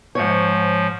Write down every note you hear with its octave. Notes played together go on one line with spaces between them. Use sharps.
G#2 F3 C#5